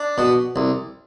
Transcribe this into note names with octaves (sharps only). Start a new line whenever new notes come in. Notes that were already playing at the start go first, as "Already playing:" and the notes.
Already playing: D4
B2
C2